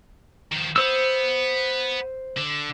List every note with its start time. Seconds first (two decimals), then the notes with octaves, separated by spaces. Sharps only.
0.52 D#3 F3
0.76 B3 C5 E6
2.37 D3